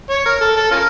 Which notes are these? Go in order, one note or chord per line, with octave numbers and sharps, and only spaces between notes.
C#5
A#4
A4
A4
C#4 F4 A#4